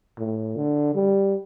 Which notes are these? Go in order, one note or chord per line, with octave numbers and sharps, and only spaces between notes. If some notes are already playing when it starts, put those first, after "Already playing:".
A2
D3
G3